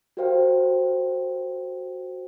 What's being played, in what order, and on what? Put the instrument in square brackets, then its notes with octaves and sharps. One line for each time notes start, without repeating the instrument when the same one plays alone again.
[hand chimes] F#4 G4 A#4 C5 F5 G5